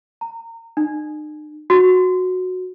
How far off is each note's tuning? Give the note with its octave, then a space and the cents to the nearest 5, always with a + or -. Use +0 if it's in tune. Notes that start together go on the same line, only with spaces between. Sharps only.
A#5 -30
D#4 -45
F#4 -10